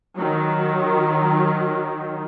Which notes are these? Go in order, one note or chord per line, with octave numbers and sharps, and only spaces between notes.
D#3 F#3